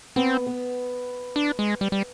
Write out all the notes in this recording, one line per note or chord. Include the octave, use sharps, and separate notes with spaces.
B3 C4
B3
D4
G#3
G3
G3